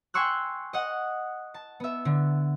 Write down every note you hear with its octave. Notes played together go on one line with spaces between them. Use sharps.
G5 G#5 C6 C#6 E6 F#6
D#5 F#5
A5
B3 E5
D3